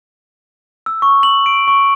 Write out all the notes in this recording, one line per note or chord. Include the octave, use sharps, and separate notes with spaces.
E6
C#6
F#7
D7
C#6